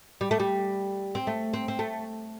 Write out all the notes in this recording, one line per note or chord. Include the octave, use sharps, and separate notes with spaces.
G3
A3
G3
C4
A3
C4
C4
A3